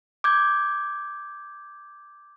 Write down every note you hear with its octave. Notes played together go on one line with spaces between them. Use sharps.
D6 G6 G#6